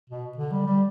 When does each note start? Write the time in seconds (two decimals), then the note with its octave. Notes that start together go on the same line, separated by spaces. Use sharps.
0.10 B2
0.38 D3
0.52 G3
0.66 G3